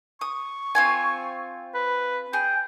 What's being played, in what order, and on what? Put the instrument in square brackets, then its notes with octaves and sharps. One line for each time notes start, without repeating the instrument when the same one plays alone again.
[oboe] C#6 [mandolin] D#6
[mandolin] C4 F4 G#5
[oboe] B4
[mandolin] G#4 [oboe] G5